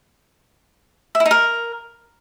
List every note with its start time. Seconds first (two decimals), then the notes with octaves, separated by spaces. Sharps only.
1.15 E5
1.20 E4
1.25 D#4
1.31 A#4